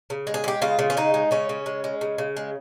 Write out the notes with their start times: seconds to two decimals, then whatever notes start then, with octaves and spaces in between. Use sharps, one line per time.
0.10 C#3
0.27 G#3
0.34 G#4
0.44 G#3 G4
0.62 C#3 F4
0.79 C#3
0.90 C#4
0.97 G#3 D#4
1.14 G#3
1.31 C#3 C#4
1.49 C#3
1.66 G#3
1.84 G#3
2.01 C#3
2.18 C#3
2.37 G#3